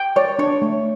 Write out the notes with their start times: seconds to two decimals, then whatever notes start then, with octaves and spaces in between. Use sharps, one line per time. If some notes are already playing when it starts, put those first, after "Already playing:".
Already playing: G5
0.16 C#5 D5
0.39 D4 C#5
0.62 A3